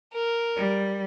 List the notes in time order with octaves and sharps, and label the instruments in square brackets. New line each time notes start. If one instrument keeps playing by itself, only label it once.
[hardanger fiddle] A#4
[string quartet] G3